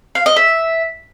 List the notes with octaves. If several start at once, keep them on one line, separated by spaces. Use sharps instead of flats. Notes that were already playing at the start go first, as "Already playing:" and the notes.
F5
D#5
E5